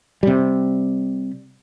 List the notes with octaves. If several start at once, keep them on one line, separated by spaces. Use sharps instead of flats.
C3 G3